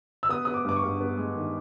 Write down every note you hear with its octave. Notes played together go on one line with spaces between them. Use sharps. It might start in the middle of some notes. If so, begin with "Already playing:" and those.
E6
B3 D#6
B3 D#6
D6
G2 D6
C#6
G2
B3
G#3
D#3